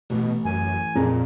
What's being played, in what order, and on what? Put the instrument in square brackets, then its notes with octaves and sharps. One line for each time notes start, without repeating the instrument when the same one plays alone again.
[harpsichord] A1 [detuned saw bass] B2
[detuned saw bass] F#2 [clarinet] G#5
[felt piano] F2 G#4 A#5 [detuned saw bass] A#2